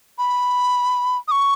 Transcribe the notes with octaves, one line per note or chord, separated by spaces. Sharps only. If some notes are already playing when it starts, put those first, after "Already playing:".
B5
D#6
C#6